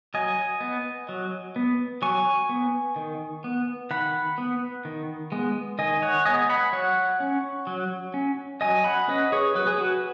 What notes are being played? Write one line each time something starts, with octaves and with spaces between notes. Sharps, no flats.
F#3 D#5 G#5
B3
F#3
B3
F#3 G#5 C#6
B3
D#3
B3
D#3 F#5 B5
B3
D#3
G#3 B3
D#3 D#5 G#5
C#5 F#5
G#3 B3 D#5 G#5
F#5 B5
F#3 C#5 F#5
C#4
F#3
C#4
F#3 D#5 G#5
F#5 B5
C#4 B4 D#5
G#4 C#5
F#3 B4
G#4
F#4 B4